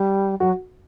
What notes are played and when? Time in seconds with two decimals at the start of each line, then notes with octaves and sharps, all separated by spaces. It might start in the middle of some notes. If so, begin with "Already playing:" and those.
Already playing: G3
0.40 F#3 F#4